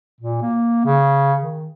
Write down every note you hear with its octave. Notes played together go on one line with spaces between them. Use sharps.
A#2
A#3
C#3
D#3